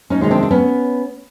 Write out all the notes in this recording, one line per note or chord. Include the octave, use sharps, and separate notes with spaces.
C#4 D#4
C3 D#3 G#3 C#4
C4 D4
D4
B3 C#4